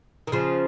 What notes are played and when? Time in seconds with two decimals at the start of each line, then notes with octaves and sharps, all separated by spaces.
0.27 D#3
0.32 C#3 F3